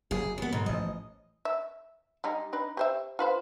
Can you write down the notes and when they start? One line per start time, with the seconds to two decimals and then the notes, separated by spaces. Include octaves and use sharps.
0.11 F#1 F#3 G3 G#4
0.38 E2 B3
0.53 G#2 B2 D3
0.66 A1 F3 D#5
1.45 E5
2.24 G3 G#3 D#4
2.53 D4 D#4 B4
2.77 G4 C5 E5
3.19 F4 B4 C5